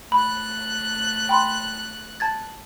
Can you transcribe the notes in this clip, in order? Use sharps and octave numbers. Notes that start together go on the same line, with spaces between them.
A3 B5 F#6
G5 B5 C6
A5 G#6 A6